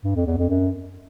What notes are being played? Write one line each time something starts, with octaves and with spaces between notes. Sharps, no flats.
G2
F2
E2
F2
F#2